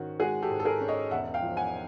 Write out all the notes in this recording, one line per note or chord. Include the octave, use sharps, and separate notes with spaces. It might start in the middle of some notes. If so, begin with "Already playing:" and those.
Already playing: G#2 D#3 C#4 F#4
G#3 F#4 G#4
G4 A4
G#2
A4
G#4 A#4
C#4
C#5 D#5
E1 E5 F#5
F5 G5
F3
F#5 G#5